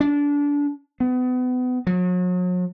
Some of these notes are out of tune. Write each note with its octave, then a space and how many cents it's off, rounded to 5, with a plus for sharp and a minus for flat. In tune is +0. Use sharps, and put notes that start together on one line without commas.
D4 -25
B3 +30
F#3 -40